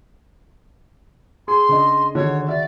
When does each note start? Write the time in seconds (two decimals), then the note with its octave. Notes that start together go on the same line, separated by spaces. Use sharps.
1.48 G#4 C6
1.69 C#3 D4 D#5
2.15 D3 D#3 F#4 C#5
2.48 F#4 D5 E5